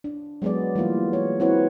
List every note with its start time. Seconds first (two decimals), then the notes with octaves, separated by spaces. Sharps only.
0.04 D4
0.42 F#3 G#3 B3 G#4 D5
0.75 E3 G3 A#3 F4
1.13 C#5
1.40 C4 E4 F#4 B4 C#5